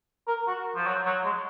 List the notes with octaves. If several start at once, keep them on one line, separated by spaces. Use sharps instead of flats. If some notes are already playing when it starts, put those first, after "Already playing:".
A#4
F#4
F3
F#3
F#3
G#3